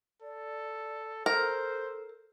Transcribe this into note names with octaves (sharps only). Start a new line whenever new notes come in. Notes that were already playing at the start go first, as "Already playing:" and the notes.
A4 D5
A4 A#4 C5